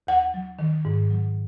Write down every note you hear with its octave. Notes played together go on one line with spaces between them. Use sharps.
D#2 F#5
F#3
D#3
G#2
F#3